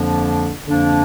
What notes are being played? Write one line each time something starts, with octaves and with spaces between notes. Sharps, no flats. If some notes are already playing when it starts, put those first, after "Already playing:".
Already playing: F2 D3 F3 A#3 D4
F2 D3 F3 A#3 D4